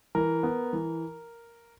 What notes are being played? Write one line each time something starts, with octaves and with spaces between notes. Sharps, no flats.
E3 A#4
B3
E3